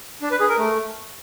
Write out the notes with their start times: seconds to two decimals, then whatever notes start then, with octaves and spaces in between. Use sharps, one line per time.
0.22 D4
0.31 B4
0.40 G#4
0.49 A#4
0.58 A3